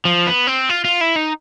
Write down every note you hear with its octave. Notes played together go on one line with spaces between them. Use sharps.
F3
B3
C4
F4
F4
E4
D#4